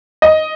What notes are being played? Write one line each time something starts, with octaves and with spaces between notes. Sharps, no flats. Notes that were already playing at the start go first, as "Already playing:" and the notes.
D#5